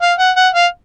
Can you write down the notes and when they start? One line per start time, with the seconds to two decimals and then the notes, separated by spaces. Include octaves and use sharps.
0.01 F5
0.18 F#5
0.36 F#5
0.54 F5